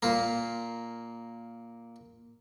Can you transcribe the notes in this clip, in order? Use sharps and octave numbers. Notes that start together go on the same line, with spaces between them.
A#2 A#3